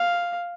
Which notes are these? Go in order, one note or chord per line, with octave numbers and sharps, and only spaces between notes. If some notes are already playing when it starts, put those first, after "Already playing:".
Already playing: F5